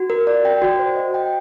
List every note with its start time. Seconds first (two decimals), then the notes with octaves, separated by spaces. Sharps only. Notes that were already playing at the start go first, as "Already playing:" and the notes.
Already playing: F#4
0.10 A#4
0.27 D5
0.45 G5
0.62 F#4
0.79 C5
0.96 D#5
1.14 G5